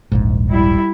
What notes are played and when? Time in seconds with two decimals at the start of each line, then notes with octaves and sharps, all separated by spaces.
0.12 D#1 A#1 G#2
0.49 G3 E4